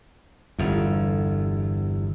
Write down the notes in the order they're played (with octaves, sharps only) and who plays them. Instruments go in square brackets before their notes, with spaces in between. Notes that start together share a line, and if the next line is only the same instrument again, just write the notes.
[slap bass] G1 E2